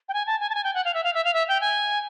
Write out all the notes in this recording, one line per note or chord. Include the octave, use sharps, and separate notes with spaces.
G5
G#5
A5
G#5
A5
G#5
G5
F#5
F5
E5
F5
E5
F5
E5
G5
G#5